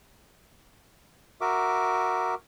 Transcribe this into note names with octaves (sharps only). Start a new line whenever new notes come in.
F#4 A#4 E5 D6